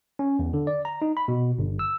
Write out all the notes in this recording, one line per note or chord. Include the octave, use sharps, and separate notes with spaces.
C#4
E2
D3
D5
A#5
D#4
B5
B2
G1
E6